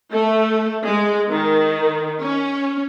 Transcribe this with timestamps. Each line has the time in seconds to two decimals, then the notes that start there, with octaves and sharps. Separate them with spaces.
0.11 A3
0.85 G#3
1.29 D#3
2.21 C#4